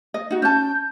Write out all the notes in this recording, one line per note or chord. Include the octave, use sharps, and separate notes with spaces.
D#5
D#4 F#4
C#4 A5 G6